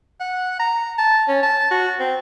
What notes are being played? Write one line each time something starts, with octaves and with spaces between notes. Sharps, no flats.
F#5
A#5
A5
C#4
A5
F#4
C4